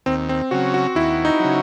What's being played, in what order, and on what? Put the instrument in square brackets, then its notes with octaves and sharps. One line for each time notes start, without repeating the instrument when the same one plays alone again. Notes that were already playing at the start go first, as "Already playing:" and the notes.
[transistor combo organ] D#2 [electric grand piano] C4
[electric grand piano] C4
[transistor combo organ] C#3 F#3 [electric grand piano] F#4
[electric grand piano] F#4
[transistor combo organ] D#2 [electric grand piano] E4
[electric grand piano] D#4
[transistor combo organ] C#3 F#3